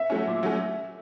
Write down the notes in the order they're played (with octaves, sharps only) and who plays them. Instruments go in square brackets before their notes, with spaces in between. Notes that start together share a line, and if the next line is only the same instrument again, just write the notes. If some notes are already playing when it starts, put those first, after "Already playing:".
Already playing: [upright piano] E5
[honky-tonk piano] F#3 A3 C#4
A#2
F#3 A3 C#4